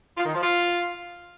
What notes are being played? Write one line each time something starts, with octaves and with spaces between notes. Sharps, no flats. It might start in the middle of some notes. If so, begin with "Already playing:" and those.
F4
D#3
F3
F4